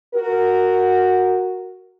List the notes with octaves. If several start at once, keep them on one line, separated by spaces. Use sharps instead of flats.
F#4 A#4